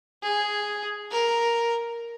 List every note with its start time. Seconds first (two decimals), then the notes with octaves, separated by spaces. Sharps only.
0.23 G#4
1.11 A#4